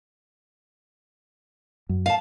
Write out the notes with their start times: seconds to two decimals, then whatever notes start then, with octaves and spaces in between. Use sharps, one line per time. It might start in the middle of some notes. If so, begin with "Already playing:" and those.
1.89 F#2
2.06 F5 A5